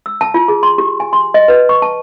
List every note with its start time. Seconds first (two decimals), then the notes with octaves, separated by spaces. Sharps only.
0.06 E6
0.21 A5
0.34 F4
0.48 G#4
0.63 C6
0.78 G4
1.00 G#5
1.13 C6
1.34 D#5
1.48 B4
1.69 C#6
1.82 A5